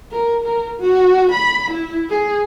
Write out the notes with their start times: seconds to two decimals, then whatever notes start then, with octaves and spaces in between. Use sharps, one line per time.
0.12 A#4
0.45 A#4
0.80 F#4
1.32 B5
1.71 E4
2.10 G#4